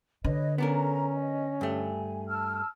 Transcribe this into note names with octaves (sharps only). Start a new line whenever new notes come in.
D3 B4 C#5 D#5
B3 C#4 D4 A4 A#4 A#5
D#5
G2 A3 G#5
A5 E6 F6